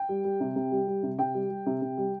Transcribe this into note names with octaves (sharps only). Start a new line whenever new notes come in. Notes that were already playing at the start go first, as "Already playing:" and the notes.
Already playing: G5
G3
G3
C3
C3
G3
G3
C3
C3 G5
G3
G3
C3
C3
G3